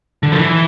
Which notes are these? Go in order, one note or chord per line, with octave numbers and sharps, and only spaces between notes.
D3
F3
E3